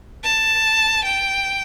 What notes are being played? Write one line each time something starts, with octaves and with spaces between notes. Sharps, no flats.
A5
G5